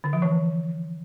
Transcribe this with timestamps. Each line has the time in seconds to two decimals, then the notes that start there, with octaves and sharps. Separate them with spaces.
0.04 D3
0.13 F3
0.22 E3